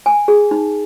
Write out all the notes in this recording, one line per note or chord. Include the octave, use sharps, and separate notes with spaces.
G#5
G#4
D#4